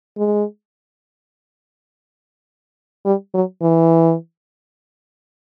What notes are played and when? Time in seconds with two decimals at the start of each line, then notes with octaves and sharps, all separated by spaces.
0.18 G#3
3.05 G3
3.34 F#3
3.62 E3